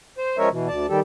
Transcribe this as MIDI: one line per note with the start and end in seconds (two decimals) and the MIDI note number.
0.18 0.37 72
0.38 0.49 53
0.38 0.49 56
0.38 0.49 61
0.38 0.49 70
0.38 0.49 73
0.38 0.49 76
0.51 0.68 47
0.51 0.68 52
0.68 0.86 38
0.68 0.86 74
0.68 0.86 81
0.89 1.00 51
0.89 1.00 55
0.89 1.00 67
0.89 1.00 69